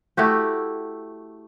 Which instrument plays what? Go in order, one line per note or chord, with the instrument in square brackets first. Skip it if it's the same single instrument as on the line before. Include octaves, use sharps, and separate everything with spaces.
[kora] A3 E4 F#4 G4